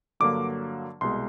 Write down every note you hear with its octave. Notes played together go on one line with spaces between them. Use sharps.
G2 D3 F#3 A#3 D6
C2 B2 G#3 C6